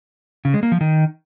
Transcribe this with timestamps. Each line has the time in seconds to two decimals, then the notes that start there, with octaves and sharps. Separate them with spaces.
0.45 C#3
0.54 G#3
0.63 A#3
0.72 F3
0.81 D#3